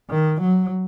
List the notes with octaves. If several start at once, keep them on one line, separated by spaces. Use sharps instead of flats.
D#3
F#3